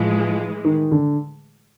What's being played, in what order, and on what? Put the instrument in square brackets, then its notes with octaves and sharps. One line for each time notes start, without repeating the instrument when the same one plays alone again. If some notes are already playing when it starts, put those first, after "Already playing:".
Already playing: [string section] A2 E3 G#3 [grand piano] F3
[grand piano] D#3
D3